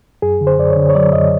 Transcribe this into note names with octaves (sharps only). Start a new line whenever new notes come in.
F#2 G#4
D3
C5
F#2 D5
C#5
D3
C#5
F#3 D5
F#2 D#5